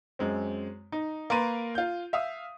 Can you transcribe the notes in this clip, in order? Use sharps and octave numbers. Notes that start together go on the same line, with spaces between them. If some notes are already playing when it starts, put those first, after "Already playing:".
F#2 G#3 C4
D#4
A#3 A#4 B4 C6 A6 D#7
F4 G6
E5 F5 D#6